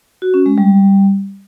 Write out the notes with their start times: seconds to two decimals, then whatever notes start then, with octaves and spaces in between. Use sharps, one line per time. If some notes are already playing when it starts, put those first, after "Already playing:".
0.22 F#4
0.34 C#4
0.46 G#3
0.58 G3